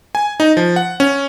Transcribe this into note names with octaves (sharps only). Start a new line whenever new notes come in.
G#5
D#4
F3
F#5
C#4